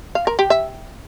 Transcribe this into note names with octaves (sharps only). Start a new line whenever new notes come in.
F5
A#4
G4
E5